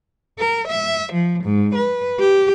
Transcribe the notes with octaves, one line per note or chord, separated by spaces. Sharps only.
A#4
E5
F3
G#2
B4
G4